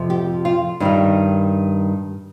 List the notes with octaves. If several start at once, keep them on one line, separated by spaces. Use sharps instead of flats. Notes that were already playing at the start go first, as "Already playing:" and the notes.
Already playing: F2 C3 F3
G4
F4
G2 D#3 G3 D#4